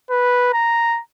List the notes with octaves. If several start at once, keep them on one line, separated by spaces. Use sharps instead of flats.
B4
A#5